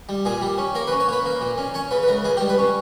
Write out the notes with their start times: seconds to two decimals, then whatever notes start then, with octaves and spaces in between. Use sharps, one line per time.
0.09 G3
0.25 A#2 G#4
0.42 G3
0.58 C#4
0.75 A#3 A#4
0.87 B4
0.92 C#4
1.00 C#5
1.08 A#3 B4
1.25 A#3
1.41 A#2
1.58 C#4
1.74 C#4 C#5
1.91 C#3 B4
2.03 B4
2.08 C#2 A#4
2.24 C#2 G#4
2.37 G4
2.41 G3
2.49 B4
2.58 C#4